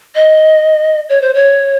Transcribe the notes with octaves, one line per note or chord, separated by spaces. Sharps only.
D#5
C#5
C5
C#5